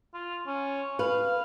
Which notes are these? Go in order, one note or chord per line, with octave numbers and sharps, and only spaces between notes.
F4
C#4
B4 F5